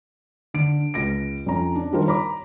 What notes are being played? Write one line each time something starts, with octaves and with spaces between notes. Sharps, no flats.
D3 D7
C#2 A#6 D7
F2 C#4 A#5
D4
D#3 G3 F4 A#4 C5
C#5 A#5 B5 D6